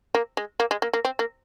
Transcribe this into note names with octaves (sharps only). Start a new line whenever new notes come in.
A#3
G#3
A#3
G#3
A#3
A#3
C4
A#3